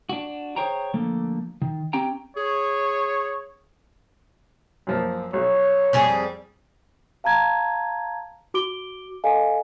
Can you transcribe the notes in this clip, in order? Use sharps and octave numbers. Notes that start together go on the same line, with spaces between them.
D4 F#4
G#4 A#4 C5 C#5 G5 A#5
D3 F3 A3 A#3
D#3
C4 C#4 G4 G5 A#5
G#4 C#5
F#2 F3 A#3
B1 C#5
F2 G3 G#4
F5 A5 A#5 G#6
F#4 D6 D7 G7
A4 D#5 F5 G#5